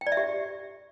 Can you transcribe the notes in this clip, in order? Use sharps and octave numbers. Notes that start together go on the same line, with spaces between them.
G5
D5
E5
G4